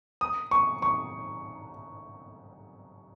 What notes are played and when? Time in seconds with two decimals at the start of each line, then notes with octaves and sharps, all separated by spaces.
0.21 D#6
0.51 C#6
0.82 C#6